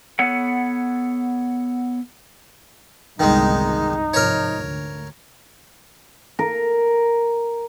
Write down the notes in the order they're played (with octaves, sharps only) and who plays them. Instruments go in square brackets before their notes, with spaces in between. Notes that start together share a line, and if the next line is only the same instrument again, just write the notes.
[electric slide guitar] B3 A4 C#5 F#5
[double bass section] G1 C2 F2 [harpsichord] D#3 G#3 [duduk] D#4
[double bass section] G#2 C3 F3 [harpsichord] A#4 C#5
[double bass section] D2
[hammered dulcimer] A#4